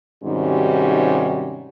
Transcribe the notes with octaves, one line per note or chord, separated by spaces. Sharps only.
G#2 C3 D#3 G3 C#4 F#4